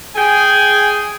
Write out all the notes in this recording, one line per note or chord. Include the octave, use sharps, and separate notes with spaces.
G#4 G5 G#5